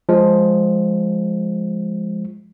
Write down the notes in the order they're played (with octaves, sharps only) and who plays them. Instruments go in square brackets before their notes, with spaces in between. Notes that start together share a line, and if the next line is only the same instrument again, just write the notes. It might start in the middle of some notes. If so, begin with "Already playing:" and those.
[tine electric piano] F3 G#3